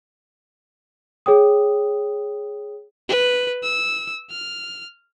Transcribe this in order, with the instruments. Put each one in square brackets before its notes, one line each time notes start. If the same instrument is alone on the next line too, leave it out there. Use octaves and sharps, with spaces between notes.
[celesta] G#4 C#5 G5 D#6
[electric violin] B4
E6
F6